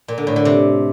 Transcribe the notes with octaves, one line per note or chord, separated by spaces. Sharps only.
A#2
D3
A2
D3
C3